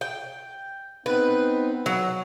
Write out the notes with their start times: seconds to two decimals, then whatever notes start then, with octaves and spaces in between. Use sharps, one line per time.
0.01 G5
1.06 B3 C4 D#4 B4
1.86 F#3 F#5